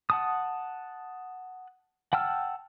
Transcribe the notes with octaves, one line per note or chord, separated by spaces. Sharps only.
F#5 A5 D#6
F#5 G5 A5 E6 F6